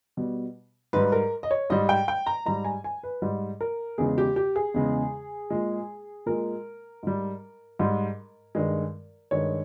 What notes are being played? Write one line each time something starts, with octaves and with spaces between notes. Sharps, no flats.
B2 G3
G#2 G3 B4
A#4
D#5
C#5
G#2 G3 D#5
G5
G5
A#5
G#2 G3 A#5
G#5
G#5
B4
G#2 G3
A#4
E2 C#3 G#3 G#4
G4
G4
G#4
E2 C#3 G#3
A#2 G#3
A#2 G#3 A#4
G#2 G3
G#2 G3
G2 D#3 G#3
G2 D#3 G#3 C#5